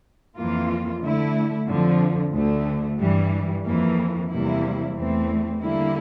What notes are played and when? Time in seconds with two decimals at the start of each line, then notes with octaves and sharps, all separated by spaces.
0.37 F2 E3 A#3 F4
1.01 D3 A3 E4
1.68 F2 D3 F3
2.33 D2 D3 A3
2.99 G2 E3 G3
3.64 F2 E3 A#3
4.30 E2 C3 G3 A#3 E4
4.96 E2 E3 A3 C4
5.61 D3 G3 A#3 E4